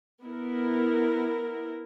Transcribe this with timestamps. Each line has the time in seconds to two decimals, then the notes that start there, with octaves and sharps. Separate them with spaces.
0.22 B3 E4 A#4